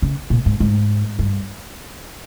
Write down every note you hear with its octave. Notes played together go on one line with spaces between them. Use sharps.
C#3
A#2
G#2
G#2
G2